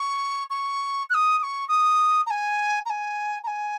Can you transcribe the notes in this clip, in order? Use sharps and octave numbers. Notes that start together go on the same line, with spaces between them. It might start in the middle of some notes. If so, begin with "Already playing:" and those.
Already playing: C#6
C#6
F#6
D#6
D#6
C#6
D#6
A#5
G#5
A#5
G#5
A#5
G#5